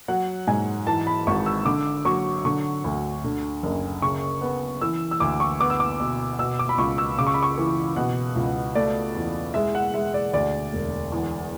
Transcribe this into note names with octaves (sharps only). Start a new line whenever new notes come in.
F#3 F#5
G#2 G#5
E3 A5
B5
G#1 C#6
E6
D3 D6
F#3 C#6
D3 C#6
D2
D3
F#1
C#3 C#6
B3
E3 E6
E6
D2 D6
C#6
B3 D6
E6
D6
B2
B2 E6
D6
B5
C#2 C#6
E6
C#3 D6
C#6
B5
C#6
E3
B2 F#5
C#2
A3 D5
E2
G#3 E5
F#5
G#3 E5
D5
D2 D5
E1
E2